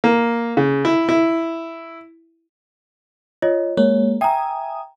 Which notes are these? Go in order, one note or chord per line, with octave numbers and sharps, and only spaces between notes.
A#3
C#3
E4
E4
F4 C#5 D#5
G#3 A#3 C#5
E5 G5 G#5 A#5 D#6